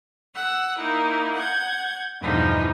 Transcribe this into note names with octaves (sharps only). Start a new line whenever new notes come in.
F#5 E6 F#6
A#3 D#4 E4
F#5 G6 G#6
E2 G2 B2 E3 F3 D#4